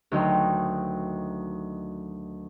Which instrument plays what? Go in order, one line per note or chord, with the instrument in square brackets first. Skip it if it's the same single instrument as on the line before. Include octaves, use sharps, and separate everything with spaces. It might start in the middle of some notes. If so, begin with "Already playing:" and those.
[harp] D2 D#3 F#3 D#4 G5 C6